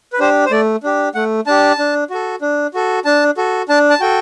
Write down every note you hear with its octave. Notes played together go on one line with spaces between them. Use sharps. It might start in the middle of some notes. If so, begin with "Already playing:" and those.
B4
D4 G4 C5
C5
A3 D5
D4 G4
A3 F#5
D4 G4 A5
D4
F#4 A4
D4
F#4 A4
D4 A5
F#4 A4
D4 A5
A5
F#4 A4 G5